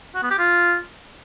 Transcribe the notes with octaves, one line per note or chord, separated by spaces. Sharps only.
F#4
B3
G4
F4